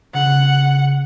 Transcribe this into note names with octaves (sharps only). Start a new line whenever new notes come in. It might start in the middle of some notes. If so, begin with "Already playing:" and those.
C#3 F#5